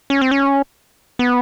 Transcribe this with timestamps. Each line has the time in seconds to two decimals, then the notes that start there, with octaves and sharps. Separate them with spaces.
0.10 C#4
0.21 C4
0.31 C#4
1.19 B3